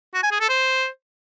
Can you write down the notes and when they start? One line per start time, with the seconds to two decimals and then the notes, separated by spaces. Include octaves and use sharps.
0.14 F#4
0.23 G#5
0.31 G#4
0.40 A4
0.49 C5